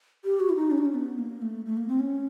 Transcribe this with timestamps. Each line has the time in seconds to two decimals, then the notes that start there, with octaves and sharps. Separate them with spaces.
0.25 G4
0.40 F#4
0.50 E4
0.56 D#4
0.71 C#4
0.78 D4
0.85 C#4
0.94 B3
1.19 A#3
1.42 A3
1.66 A3
1.77 A#3
1.88 C4
2.00 C#4